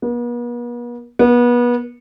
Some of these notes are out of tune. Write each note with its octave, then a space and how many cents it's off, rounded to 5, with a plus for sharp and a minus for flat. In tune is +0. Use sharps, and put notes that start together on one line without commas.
B3 -45
B3 -30